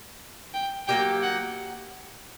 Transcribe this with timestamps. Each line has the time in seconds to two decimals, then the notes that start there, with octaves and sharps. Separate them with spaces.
0.54 G5
0.88 F#3 A#3 D#4 G4 G5
1.22 F#5